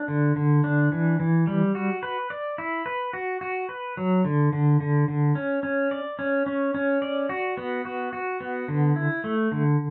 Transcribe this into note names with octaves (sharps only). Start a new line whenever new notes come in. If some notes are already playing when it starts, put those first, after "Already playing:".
Already playing: D4
D3
D3
D4
E3
E3
G3
F#4
B4
D5
E4
B4
F#4
F#4
B4
F#3
D3
D3
D3
D3
C#4
C#4
D5
C#4
C#4
C#4
D5
F#4
B3
F#4
F#4
B3
D3
E4
A3
D3